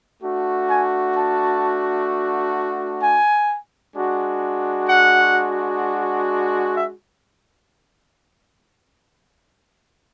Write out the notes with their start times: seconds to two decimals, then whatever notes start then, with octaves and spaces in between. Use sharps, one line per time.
0.22 A3 D4 F#4
0.68 G#5
1.15 A5
3.02 G#5
3.96 G#3 D4 F#4
4.89 F#5
6.76 E5